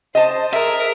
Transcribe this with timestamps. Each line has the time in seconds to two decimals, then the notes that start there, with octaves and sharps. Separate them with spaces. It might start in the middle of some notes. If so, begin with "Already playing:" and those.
0.15 C5 D#5 A5
0.53 G#4 A#4 E5